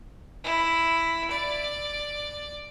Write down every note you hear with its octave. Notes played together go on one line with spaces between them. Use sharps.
E4
D5